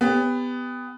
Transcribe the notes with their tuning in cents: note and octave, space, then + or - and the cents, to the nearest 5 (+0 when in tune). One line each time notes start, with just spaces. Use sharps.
B3 +15 G4 +30